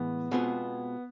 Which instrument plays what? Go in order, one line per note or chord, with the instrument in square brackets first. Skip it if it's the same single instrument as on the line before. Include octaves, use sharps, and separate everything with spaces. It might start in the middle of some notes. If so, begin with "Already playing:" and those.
Already playing: [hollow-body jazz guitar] A2 E3 G#3 [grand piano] B3
[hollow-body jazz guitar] B2 G#3 C4 F4 G#4 [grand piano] B3